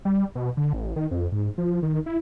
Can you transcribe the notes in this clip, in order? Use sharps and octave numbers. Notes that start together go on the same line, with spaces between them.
G3
B2
D3
A1
D#3
F2
G#2
F3
D#3
E4